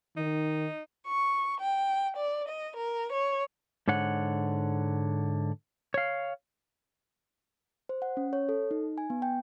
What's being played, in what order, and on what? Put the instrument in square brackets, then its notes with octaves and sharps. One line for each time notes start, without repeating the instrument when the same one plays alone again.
[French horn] D#3 [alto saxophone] D#4
[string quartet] C#6
G5
D5
D#5
A#4
C#5
[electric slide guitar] G#2 D3 C#5 F#5
C#5 F5
[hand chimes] C5
F#5
C#4
C#5
A4
D#4
G#5
B3
G5